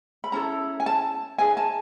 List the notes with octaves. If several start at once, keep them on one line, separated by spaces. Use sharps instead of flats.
B5
C#4 E4 A4 A#5
G#5
A5
D#4 G#4 B4 G#5
A5